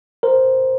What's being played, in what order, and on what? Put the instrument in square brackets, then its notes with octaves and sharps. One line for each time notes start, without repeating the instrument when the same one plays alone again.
[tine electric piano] A#4 C5